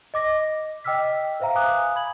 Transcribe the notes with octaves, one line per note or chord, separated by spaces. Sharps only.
D#5 D6 A#6
D#5 G5 D6 E6 F6 B6
B4 C5 E5 F5 A#5
F5 G#5 A#5 D6 D#6 F#6
B5 G#6 F#7